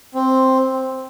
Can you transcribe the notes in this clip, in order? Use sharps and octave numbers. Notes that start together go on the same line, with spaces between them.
C4